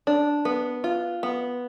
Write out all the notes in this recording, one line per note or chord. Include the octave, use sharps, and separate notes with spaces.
D4
B3
F4
B3